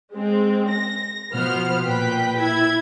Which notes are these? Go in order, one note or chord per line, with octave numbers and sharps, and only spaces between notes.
G#3 C4
A#6
B2 F3 B3 C5 F6
A#2 B4 G5 B6
E4 G#6